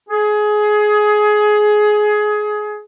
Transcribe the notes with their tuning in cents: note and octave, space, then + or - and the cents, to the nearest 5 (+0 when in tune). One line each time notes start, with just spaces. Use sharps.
G#4 +20